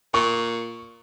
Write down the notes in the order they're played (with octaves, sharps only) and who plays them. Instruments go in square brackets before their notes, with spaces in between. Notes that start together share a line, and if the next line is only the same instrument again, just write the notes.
[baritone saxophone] A#2 [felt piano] C#6